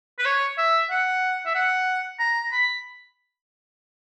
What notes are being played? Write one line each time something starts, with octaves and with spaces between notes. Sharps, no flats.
B4
C#5
E5
F#5
E5
F#5
A#5
B5